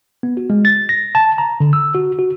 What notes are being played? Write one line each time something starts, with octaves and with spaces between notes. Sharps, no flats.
B3
F#4
G#3
A6
A#6
A5
A#5
D3
E6
F#4
F#4